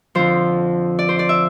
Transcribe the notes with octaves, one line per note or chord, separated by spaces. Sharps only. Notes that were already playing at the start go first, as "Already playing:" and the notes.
F2 D3 F3 C5
D5
C5
D5
E5